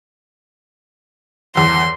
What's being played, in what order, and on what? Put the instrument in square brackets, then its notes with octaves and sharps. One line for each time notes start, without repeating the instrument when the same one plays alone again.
[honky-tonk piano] G1 E2 [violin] C6